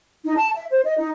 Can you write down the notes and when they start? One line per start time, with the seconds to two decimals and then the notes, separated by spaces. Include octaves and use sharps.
0.25 D#4
0.37 A5
0.56 E5
0.71 C5
0.85 D#5
0.98 D#4